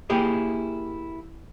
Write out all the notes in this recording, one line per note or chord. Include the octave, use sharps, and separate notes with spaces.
A#3 E4 G4 G#4